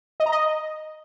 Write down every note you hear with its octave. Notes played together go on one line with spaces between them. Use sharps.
D#5
A#5
D#5